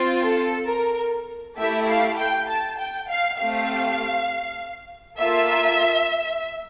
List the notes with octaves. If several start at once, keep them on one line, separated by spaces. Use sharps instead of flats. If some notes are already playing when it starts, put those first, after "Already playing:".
Already playing: C4 F4
A4
A#4
A3 E4 G4 E5
F5
G5
A5
G5
F5
A3 C4 G4 F5
A#3 F4 A4 E5